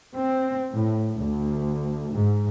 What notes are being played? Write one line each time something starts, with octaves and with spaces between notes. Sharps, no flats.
C4
A2
D2
G#2